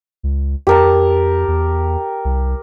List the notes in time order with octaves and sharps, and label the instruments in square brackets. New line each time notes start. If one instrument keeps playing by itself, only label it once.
[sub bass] C#2
[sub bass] F2 [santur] G4 A#4 A5
[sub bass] E2
C2